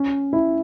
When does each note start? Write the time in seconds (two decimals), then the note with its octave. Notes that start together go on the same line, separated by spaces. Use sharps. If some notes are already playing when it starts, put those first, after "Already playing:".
Already playing: C#4
0.33 E4